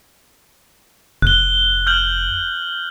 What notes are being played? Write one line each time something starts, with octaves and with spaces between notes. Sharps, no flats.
F1 F#6 G7
F6 G6 F#7